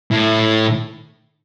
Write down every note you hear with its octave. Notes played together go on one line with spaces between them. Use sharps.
A2